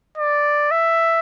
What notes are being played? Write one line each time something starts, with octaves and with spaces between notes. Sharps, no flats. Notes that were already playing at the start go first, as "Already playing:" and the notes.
D5
E5